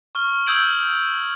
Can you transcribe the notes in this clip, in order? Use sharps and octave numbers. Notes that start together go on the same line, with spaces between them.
C#6 F6 G7
D#6 E6 G6 G#6 D7 F#7